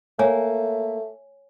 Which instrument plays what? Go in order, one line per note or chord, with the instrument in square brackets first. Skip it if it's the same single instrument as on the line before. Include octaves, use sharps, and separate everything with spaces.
[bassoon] A3 [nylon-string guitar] A#3 [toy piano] C#5 G#5